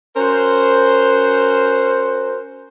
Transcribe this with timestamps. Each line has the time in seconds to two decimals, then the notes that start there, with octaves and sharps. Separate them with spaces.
0.16 C#4 F#4 A#4 C5